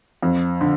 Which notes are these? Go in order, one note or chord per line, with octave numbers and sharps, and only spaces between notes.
F2
D3